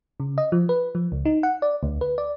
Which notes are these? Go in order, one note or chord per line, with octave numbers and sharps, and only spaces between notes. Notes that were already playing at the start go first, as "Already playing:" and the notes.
C#3
D#5
F3
B4
F3
C#2
D#4
F#5
D5
D2
B4
D5